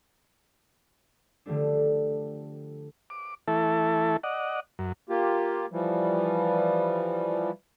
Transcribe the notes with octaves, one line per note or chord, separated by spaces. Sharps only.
D3 F3 G3 A3 D4
D6
E3 A3 E4 A4
D5 D#5 F#5
F#2
A#3 F4 G4
E3 F3 G3